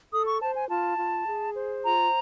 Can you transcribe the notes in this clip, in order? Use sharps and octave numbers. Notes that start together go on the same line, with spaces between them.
A4 D#6
C#6
C5 A5
G#5
F4 A5
F4
G#4
C5
F4 A#5